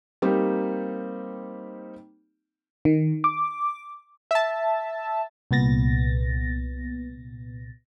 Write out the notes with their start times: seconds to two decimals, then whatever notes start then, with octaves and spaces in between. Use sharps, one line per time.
0.22 G3 A#3 C4 D#4 G4
2.85 D#3
3.24 D6
4.31 E5 A5
5.51 C2 A#2 B3 A6 A#6